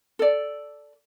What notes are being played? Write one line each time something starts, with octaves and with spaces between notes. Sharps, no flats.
A4 D5